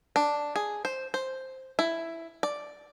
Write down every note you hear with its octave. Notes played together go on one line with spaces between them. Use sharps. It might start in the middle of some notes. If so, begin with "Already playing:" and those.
D4
G#4
C5
C5
E4
D5